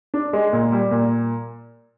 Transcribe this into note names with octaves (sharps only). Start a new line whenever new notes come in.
D4
G#3
A#2
G3
A#2